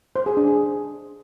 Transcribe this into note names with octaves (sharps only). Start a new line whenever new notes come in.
C5
G#4
D4
G#4